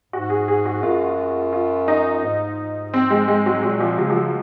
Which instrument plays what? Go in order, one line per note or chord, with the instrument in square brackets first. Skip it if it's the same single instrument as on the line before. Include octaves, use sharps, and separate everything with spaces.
[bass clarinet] G#2 [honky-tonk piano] F#4
[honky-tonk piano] G#4
G#4
F#4
[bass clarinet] F#2 [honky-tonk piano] F4
[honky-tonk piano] F4
D#4
[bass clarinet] G#2
[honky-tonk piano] C4
G#3
G#3
F#3
[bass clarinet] A#2 [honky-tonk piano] F#3
[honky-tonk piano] F3
[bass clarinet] C#3 [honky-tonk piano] F#3
[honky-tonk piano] F3
F#3